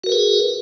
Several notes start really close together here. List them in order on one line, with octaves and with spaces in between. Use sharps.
F#4 A#4 B4 G#4